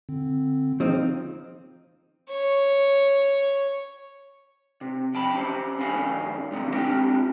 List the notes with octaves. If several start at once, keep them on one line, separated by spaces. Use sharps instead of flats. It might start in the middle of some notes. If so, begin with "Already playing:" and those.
D3 C4
F3 C4 D#4 G#4
C#5
C3
F2 G5 A5 B5
C#4 G4 C5
G2 D#3 C#4 F5 G#5 B5
G2 C3 D#3 E3
C4 D4 F4 G4 G5 G#5